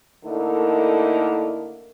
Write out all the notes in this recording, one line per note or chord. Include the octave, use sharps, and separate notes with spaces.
D3 A3 A#3 D#4 E4 A#4